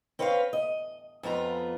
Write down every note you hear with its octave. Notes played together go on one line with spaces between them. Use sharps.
C4 C#4 B4 C#5 D5 F5
D#5
F2 B3 F4 A#5